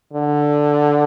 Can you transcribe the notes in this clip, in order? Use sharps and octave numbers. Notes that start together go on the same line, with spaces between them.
D3